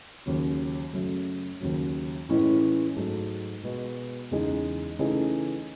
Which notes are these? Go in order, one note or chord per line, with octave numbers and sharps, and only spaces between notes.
D#2 C#3 F#3
F#2 C#3 F#3 A3
D#2 C#3 F#3
A2 E3 G#3 C#4 E4
G#2 F#3 A3
B2 G#3 B3 F#4
E2 C#3 G#3 D#4 G#4
C#3 E3 A3 D#4 G#4